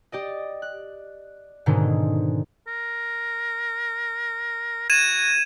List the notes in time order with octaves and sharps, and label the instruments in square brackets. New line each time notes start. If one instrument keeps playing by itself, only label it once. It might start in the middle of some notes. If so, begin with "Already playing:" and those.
[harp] G4 D5 D#5
F#6
G#2 B2 D3 D#3 G#3 C4
[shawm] A#4
[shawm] F#4 [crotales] G#6 D#7 E7